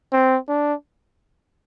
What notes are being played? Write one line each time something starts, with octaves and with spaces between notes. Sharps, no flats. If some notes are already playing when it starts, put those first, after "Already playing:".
C4
D4